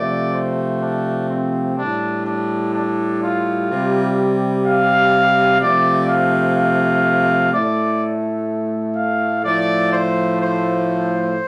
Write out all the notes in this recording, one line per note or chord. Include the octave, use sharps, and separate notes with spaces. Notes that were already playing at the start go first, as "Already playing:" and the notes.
Already playing: C3 F3 A3 D5
C5
D4
C4
A2 G3 D4
D4
D4
F4
C3 G3
F5
C3 F3 A3 D5
F5
F5
A2 A3 D5
F5
A2 F3 A3 D5
C5
C5